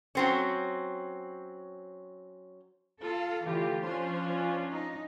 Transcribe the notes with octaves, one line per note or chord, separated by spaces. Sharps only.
F#3 C4 C#4
F4 A4 F5
D3 E3 A3 F4 G4
F3 C#4 D4 F4 C5
D#4